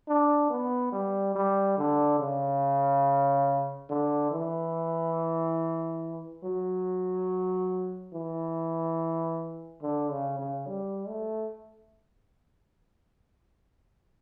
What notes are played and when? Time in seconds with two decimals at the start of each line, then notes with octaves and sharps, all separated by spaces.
0.08 D4
0.50 B3
0.93 G3
1.36 G3
1.78 D3
2.20 C#3
3.90 D3
4.31 E3
6.43 F#3
8.13 E3
9.82 D3
10.10 C#3
10.39 C#3
10.67 G3
11.09 A3